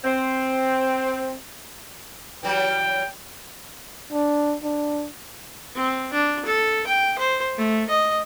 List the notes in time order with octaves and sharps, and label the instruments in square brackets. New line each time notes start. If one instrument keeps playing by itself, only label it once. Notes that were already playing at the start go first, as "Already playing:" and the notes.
[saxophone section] C4
[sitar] E3 F#3 G3 [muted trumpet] G5
[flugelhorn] D4
D4
[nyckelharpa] C4
D4
A4
G5
C5
A3
D#5